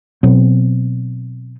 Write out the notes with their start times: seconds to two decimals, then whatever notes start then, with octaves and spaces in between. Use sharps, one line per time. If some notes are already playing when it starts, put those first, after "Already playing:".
0.23 B2 F#3 B3 C4